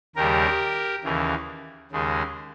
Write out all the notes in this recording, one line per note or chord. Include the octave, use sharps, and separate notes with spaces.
D#2 C#3 G3 G4 A#4
D#2 C#3 E3
D#2 C#3 G#3